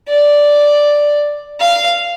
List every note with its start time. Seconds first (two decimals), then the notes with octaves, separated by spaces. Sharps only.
0.09 D5
1.60 F5